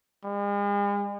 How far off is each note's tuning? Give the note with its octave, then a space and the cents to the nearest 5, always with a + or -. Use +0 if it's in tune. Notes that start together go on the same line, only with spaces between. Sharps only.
G#3 -45